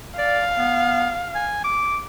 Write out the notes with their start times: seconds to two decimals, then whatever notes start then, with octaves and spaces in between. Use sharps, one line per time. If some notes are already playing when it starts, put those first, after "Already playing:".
0.18 D5 F5
0.58 B3
1.35 G#5
1.64 D6